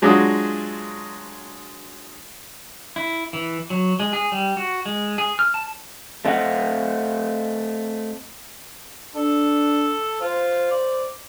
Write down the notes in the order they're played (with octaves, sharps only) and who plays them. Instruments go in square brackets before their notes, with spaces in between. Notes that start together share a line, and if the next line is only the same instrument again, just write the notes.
[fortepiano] F#3 G#3 D4 F4 F#4 G#4
[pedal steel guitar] E4
E3
F#3
G#3
G#4
G3
F#4
G#3
G#4
F6
A5
[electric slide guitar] A3 C4 D#5 F5 F#5
[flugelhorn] D4 [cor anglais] A4
[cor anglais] F4 [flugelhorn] C5
[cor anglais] D5